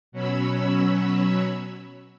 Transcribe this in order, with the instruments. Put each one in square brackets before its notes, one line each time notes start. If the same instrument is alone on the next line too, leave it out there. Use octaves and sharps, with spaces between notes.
[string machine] B2 F#3 C#4 C#5 B5 E6